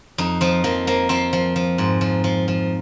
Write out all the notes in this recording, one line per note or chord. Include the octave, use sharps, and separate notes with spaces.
F2 D#4
F3 C4
F3 A#3
F3 A#3
F3 C4
F3
F3
G#2
F3
F3
F3